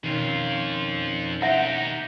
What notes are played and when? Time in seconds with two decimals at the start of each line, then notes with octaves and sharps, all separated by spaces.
0.04 F2 B2 D#3 C#4 F4
1.42 D#4 G4 E5 F#5